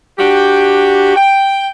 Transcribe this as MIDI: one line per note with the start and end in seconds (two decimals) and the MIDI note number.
0.19 1.13 62
0.19 1.13 66
0.19 1.13 67
1.17 1.70 79